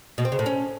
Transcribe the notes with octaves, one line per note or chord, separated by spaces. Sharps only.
B2
C4
C#3
A2
C#4